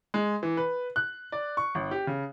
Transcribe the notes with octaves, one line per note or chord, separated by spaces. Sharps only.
G#3
E3
B4
F#6
D5
C#6
G1
G4
C#3